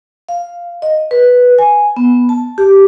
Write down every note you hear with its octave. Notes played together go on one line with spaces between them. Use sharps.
F5
D#5
B4
G#5
B3
A5
G4